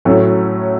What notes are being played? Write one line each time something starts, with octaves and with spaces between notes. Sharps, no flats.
A2 F#3 A3 C#4